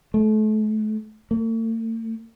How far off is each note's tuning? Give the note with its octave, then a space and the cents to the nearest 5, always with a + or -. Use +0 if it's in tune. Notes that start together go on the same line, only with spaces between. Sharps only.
A3 -35
A3 +45